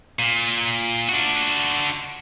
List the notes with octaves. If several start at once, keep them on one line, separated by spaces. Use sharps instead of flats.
A#2
D4 F#4